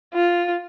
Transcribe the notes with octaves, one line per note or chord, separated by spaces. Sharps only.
F4